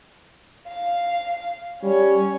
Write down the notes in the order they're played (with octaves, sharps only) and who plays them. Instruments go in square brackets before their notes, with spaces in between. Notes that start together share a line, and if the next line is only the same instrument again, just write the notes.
[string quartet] F5
[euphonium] G3 [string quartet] C#4 C#5